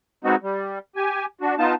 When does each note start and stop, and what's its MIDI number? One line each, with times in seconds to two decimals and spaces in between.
0.24 0.36 56
0.24 0.36 59
0.24 0.36 60
0.24 0.36 63
0.24 0.36 66
0.43 0.79 55
0.96 1.26 67
0.96 1.26 80
1.41 1.55 62
1.41 1.55 66
1.58 1.75 59
1.58 1.75 63
1.58 1.75 65
1.58 1.75 81